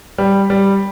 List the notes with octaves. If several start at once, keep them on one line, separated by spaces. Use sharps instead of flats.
G3
G3